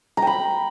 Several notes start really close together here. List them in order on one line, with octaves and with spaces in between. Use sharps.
A#5 G5 B5